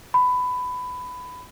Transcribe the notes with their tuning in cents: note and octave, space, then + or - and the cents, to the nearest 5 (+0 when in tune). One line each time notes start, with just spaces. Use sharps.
B5 +15